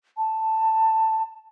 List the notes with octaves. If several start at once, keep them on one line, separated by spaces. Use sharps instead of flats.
A5